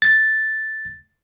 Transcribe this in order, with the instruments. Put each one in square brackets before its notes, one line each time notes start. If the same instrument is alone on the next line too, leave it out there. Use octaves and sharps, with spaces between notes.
[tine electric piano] A6